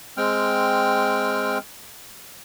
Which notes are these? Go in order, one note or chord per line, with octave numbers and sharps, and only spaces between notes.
G#3 C4 G5 F6